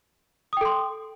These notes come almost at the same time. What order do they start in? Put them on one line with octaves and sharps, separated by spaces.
D#6 G5 A4 C6